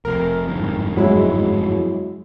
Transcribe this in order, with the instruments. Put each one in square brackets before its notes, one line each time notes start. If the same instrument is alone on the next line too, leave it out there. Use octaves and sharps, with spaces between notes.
[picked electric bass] F1 F2 C3 [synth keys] A#4
[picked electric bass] G1 F2 G#2
[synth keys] F#3 G#3 E4